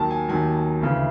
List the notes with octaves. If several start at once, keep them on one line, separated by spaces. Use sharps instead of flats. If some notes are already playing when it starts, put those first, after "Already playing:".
Already playing: D#2 D#3 F#3 A5
G#5
D#2 D#3 F#3 G#5
D2 C#3 E3